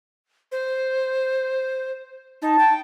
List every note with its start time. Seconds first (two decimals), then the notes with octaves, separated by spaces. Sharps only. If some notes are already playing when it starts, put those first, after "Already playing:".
0.52 C5
2.42 D#4 A5
2.59 G5